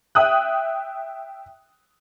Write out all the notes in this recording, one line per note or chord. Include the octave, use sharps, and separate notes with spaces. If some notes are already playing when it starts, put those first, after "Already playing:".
E5 G5 D#6 F#6